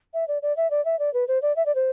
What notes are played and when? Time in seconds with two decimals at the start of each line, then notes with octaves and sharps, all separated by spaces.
0.14 E5
0.28 D5
0.42 D5
0.57 E5
0.71 D5
0.85 E5
0.99 D5
1.14 B4
1.28 C5
1.42 D5
1.56 E5
1.66 D5
1.75 C5